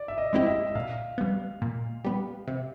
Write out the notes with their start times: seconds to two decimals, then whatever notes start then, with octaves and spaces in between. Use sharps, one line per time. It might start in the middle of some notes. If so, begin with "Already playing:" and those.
Already playing: D5
0.08 E5
0.18 D#5
0.33 G#3 C4 E4 G4 D#5
0.46 E5
0.67 E5
0.75 A#2 F5
1.18 G3 B3
1.62 A#2
2.05 G3 B3
2.48 C3